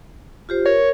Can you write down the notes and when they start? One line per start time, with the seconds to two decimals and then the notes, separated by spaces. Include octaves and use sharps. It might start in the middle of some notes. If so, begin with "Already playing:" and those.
0.49 F4 G4 C5
0.66 A#4 C#5